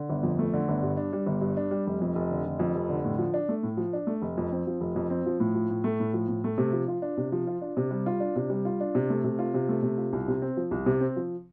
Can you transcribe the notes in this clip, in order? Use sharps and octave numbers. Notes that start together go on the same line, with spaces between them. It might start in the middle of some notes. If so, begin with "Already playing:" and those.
Already playing: D3
G1
F2
A3
D3
G1
G2
D4
G3
G1
G2
D4
G3
F1
F2
F1
D3
F1
F2
F1
D3
A2
F3
D4
A3
A2
F3
D4
A3
F1
F2
C4
F3
F1
F2
C4
F3
A2
F3
A2
A3
A2
F3
A2
A3
C3
F3
F4
D4
C3
F3
F4
D4
C3
G3
F4
D4
C3
G3
F4
D4
C3
A3
C3
F4
C3
A3
C3
F4
C2
C3
C4
F3
C2
C3
C4
F3